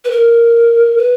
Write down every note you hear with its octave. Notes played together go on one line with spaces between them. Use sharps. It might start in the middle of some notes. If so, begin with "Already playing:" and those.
B4
A#4
B4